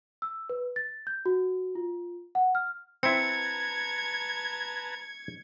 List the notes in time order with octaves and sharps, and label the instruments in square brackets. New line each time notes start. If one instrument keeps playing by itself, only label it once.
[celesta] E6
B4
A6
G6
F#4
F4
F#5
F6
[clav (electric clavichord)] C4 E4 [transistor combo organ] B4 A5 A#5 [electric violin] G#6 [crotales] C#7